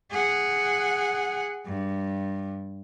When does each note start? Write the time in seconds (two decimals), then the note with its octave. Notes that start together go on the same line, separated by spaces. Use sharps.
0.11 G#4 F#5
1.66 G2